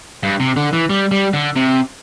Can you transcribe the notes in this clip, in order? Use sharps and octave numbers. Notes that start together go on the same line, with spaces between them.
G2
C3
D3
E3
G3
G3
D3
C3